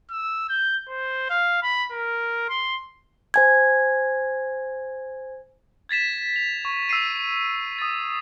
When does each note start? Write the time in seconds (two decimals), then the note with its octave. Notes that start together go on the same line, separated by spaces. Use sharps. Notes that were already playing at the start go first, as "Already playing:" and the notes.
0.11 E6
0.49 G6
0.88 C5
1.29 F5
1.62 B5
1.91 A#4
2.49 C6
3.34 C5 G#5 G#6
5.89 G#6 A6 B6 E7
6.36 F7
6.65 C#6
6.89 E6 B6 C7 D#7
7.78 D#6 A6